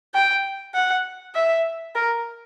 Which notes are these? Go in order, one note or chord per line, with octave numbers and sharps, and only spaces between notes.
G5
F#5
E5
A#4